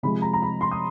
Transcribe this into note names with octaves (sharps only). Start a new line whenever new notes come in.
C3 F3 G#3 B5
A#5
A#5
B5
C6
D#6